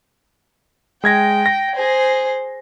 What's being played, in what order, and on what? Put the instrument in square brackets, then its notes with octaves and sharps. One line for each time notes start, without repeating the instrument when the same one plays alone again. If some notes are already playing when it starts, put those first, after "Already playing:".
[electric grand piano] G#3 G#6 A#6 [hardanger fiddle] G5
[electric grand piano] A#6
[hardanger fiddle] G#4 C5